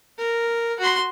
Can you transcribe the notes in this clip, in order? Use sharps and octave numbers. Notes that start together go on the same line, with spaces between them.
A#4
F#4 C6